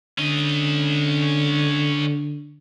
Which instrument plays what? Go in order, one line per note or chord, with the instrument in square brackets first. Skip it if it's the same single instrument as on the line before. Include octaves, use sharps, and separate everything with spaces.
[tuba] D3 [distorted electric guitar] C#4 D#5